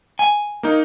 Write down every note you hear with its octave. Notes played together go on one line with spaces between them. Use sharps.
G#5
A#3 D#4